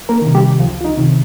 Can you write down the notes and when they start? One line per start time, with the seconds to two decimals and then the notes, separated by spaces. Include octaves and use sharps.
0.09 A#3 A#4
0.22 C3 D#3
0.35 G3 G4
0.60 C#2 F3 F4
0.81 F4
0.85 D#4
0.98 C3 D#3